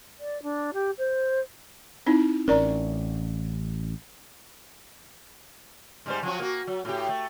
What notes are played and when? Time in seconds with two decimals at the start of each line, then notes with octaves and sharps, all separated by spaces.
0.19 D5
0.43 D4
0.73 G4
0.98 C5
2.06 C4 D#4 E4
2.48 A1 C#4 A#4 D5 A#5
6.06 G#2 G3 C5
6.23 F3 F#3 F#4
6.40 A#3 F#4
6.67 F#3
6.85 A2 G4
7.09 A3